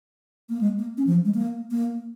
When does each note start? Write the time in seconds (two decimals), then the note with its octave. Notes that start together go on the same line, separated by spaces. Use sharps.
0.50 A#3
0.61 G#3
0.79 A#3
0.98 C#4
1.07 F3
1.25 G#3
1.35 A#3
1.71 A#3